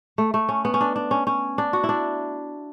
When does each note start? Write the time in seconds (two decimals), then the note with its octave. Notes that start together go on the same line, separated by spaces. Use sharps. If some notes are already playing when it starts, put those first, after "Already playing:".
0.18 A3
0.34 A3
0.49 C#4
0.65 B3
0.74 C#4
0.81 D4
0.96 D4
1.11 C#4
1.27 C#4
1.58 D4
1.73 F#4
1.84 E4
1.89 D4